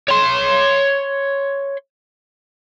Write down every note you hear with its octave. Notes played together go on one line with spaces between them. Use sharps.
C#5 C6